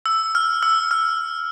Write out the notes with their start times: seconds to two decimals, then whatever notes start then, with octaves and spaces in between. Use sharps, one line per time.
0.06 E6
0.35 F6
0.63 E6
0.91 F6